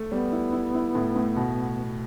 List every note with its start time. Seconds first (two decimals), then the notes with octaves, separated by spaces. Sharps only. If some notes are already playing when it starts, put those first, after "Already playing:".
Already playing: A3
0.11 G3 B3
0.32 E4
0.53 E4
0.75 E4
0.95 A2
1.16 A2
1.36 B2